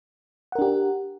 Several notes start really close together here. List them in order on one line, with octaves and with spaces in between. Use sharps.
F#5 A#4 D4 G4